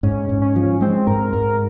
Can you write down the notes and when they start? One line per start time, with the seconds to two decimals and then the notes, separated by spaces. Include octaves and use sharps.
0.03 G#2 C#4
0.29 G#2
0.42 C#4
0.56 F3
0.81 G#3 C4
1.07 G#2 A#4
1.33 G#2 A#4